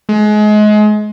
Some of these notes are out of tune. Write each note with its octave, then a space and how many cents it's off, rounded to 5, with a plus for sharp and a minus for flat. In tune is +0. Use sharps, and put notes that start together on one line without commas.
G#3 +30